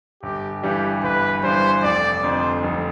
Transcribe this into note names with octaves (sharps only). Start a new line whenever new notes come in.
G1 G4
G2 E3 G3 G4
G1 B4
G2 E3 G3 C5
F1 D5
F2 D3 C5
F1